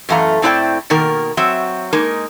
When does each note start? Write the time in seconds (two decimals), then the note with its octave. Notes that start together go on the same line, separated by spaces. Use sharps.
0.09 F#2 E3 A3 F5 A#5
0.42 A2 C4 E4 B4 D5 G5
0.90 B2 D#3 A#3 A#4
1.37 F#3 C4 E5
1.93 G#3 A#3 D#4 A#4